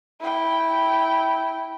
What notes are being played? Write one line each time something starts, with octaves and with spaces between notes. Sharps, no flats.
E4 G5